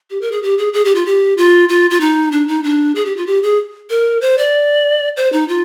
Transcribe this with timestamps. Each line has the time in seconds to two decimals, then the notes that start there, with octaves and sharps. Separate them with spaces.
0.10 G4
0.21 A#4
0.32 G#4
0.43 G4
0.58 G#4
0.73 G#4
0.85 G4
0.95 F4
1.06 G4
1.37 F4
1.69 F4
1.90 F4
2.00 D#4
2.32 D4
2.48 D#4
2.64 D4
2.95 G#4
3.06 G4
3.17 F4
3.27 G4
3.43 G#4
3.90 A#4
4.21 C5
4.38 D5
5.17 C5
5.33 D#4
5.48 F4